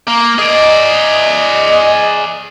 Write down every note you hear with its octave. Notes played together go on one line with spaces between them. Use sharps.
A#3
G#4 D5 D#5